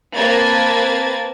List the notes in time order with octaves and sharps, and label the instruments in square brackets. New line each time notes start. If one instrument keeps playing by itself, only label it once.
[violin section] A#3 C4 B4 A5 G#6 A6